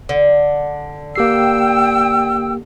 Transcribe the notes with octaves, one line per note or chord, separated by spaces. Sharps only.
D3
A#3 G4 G5 E6 C7